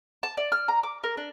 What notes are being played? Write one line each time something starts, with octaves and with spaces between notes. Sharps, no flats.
A5
D5
F6
A#5
D6
A#4
D4